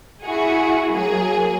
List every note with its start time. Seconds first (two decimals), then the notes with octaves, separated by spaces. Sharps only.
0.24 E4 F#4 G#4
0.91 F#3 A#3 G#4